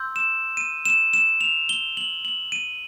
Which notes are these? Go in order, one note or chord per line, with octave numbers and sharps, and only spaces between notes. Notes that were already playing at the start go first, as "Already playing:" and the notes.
Already playing: C6 E6 G6
E7
D#7
E7
E7
F7
G7
F#7
F#7
D#7